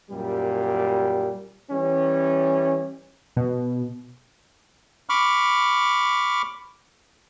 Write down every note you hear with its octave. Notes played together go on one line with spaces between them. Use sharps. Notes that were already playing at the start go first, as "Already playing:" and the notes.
F#2 A#2 G3
E3 G3 C#4
B2
B5 C#6 D6 F6